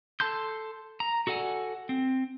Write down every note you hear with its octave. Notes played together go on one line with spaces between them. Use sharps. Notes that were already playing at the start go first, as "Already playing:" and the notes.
A4 A5 C6 G6
A#5
F#4 A4 D5 F#5 G#5
C4